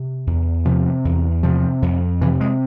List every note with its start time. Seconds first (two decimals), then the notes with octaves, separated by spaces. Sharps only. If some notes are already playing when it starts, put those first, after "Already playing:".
Already playing: C3
0.27 E2
0.65 C3 F3
1.05 E2
1.43 C3 F3
1.82 F2
2.21 C3 E3
2.41 G#3